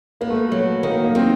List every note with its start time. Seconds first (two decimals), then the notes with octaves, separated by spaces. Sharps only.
0.21 A#3 B3
0.30 A3
0.49 F#3 A3
0.83 D#3 A#3
1.04 A#3
1.15 D#3 C4